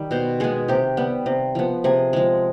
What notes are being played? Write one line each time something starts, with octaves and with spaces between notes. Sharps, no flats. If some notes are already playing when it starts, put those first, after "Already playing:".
Already playing: D#3 G3
B2 C5
G#3 B3 G#4
C3 G4
G3 B3
C3
F3 B3
C3 G#4
F3 G#3